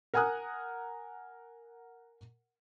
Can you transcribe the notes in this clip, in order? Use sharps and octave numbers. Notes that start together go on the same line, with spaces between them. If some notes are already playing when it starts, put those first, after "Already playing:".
A#4 F#5 G#5 A#5 D#6 F#6